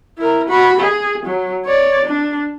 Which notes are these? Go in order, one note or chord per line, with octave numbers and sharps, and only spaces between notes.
E4 A#4
F#4 B5
G#4
F#3
C#5 D5
D4